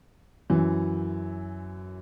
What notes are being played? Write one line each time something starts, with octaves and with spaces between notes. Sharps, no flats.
F#2 E3